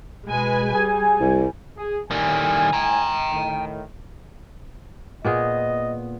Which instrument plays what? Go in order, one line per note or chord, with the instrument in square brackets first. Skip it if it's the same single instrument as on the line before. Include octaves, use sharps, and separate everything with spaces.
[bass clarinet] B2 [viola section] G#3 B4 G#5
[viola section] G3 [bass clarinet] G#4 [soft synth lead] G#5
[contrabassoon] C2
[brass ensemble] G#4
[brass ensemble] A2 G#5 [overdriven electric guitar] D#3 G3
[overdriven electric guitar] G5 A#5
[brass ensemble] A2 D#3
[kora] A#2 B3 G#4 [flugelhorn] D#5